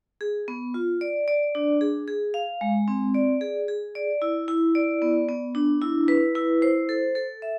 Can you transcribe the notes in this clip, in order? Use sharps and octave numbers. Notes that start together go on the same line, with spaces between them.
G#4
B3
F4
D5
D5
D4
G#4
G#4
F5
G#3
C4
D5
G#4
G#4
D5
E4
E4
D5
B3
B3
D4
E4
B4
E4
C5
A4
A4
E5